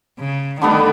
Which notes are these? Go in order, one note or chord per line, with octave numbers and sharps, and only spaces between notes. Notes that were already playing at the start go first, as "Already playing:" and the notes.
C#3
D3 D#3 G3 A3 B3